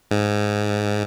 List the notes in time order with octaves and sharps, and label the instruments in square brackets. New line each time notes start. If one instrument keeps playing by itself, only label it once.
[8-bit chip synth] G#2